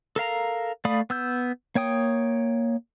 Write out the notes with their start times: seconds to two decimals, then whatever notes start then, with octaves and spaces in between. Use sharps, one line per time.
0.16 A4 A#4 F5 A#5
0.85 A3 D5 F5 B5 D#6
1.10 B3 E6 G6
1.75 A#3 C#5 G5 D#6